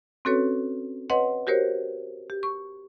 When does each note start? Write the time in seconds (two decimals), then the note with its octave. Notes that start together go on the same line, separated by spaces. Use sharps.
0.25 C4 C#4 F#4 A4 B4 C#5
1.10 B4 C#5 D#5 F#5 C6
1.47 F#4 G4 A#4 C5 C#5
2.30 G4
2.43 C#6